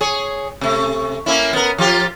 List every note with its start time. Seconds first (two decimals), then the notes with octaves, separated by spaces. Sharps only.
0.01 G#4 C#5
0.61 C3 A3
1.26 A#3 C#4 E4
1.53 B3 A#4
1.78 F3 F4 G4